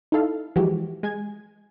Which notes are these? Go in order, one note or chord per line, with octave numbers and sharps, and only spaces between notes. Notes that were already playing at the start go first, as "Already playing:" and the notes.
D#4 E4 A4 F5
E3 F3 G#3 F#4 G4
G#3 G#5 G#6